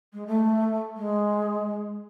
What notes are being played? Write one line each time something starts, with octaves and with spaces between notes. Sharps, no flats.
G#3
A3
G#3